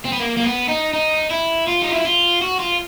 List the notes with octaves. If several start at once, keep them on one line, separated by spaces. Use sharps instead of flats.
C4
B3
A#3
A#3
B3
D#4
D#4
E4
F4
D#4
E4
F4
F#4
F4